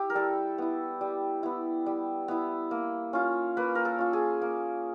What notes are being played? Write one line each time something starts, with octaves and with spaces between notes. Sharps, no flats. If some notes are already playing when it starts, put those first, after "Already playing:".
Already playing: E4 G4
A#4
G3 A4
B3 E4
G3
B3 E4
G3
B3 E4
A#3
C#4 F4
A#3 B4
A#4
A4
C#4 F4
G#4
A#3